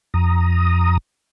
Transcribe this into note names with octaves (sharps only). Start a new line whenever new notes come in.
F2 A#5 D#6